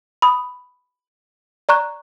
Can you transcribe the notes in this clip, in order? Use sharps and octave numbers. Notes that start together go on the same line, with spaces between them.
B5 D#6
D5 A#5 C#6 F#6